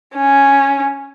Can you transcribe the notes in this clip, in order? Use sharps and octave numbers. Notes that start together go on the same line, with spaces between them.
C#4